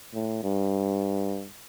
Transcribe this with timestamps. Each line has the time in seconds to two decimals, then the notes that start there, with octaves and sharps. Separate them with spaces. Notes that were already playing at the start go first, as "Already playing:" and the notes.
0.14 A2
0.43 G2